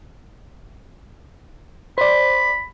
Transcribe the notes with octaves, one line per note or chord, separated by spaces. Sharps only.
C5 D5 B5